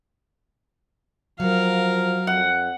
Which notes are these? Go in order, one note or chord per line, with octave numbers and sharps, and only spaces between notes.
F3 F#3 A#4 F5
F2 F#5